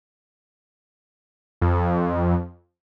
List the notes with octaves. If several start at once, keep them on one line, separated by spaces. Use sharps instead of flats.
F2